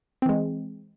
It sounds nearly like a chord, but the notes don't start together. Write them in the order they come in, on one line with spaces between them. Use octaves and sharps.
C4 E3 G#3